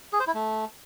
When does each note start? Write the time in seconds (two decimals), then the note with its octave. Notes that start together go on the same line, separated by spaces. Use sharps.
0.13 G#4
0.20 C5
0.27 E4
0.34 A3